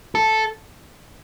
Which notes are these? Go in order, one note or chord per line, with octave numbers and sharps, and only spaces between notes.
A4